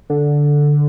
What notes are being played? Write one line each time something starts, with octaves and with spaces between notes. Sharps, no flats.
D3